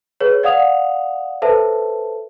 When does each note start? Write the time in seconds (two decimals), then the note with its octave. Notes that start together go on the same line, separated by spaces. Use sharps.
0.20 G#4 B4 C#5
0.43 D5 F5 F#5 D#6 F7
1.42 A4 B4 C5 E5 A5